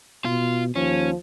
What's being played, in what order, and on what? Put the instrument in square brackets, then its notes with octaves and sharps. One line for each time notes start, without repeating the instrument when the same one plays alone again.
[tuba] B2 [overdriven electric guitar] F4
[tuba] D#2 [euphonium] F3 [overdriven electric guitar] C#4